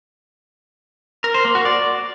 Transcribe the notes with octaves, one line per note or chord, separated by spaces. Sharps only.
A#4
C5
A#3
F#4
D5